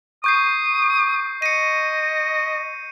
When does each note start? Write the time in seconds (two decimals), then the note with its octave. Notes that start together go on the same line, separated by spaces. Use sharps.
0.24 C#6 D#6 G6 C7
1.42 D#5 C#7 D#7